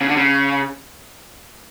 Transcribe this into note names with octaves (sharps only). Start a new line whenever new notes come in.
C#3
D3
C#3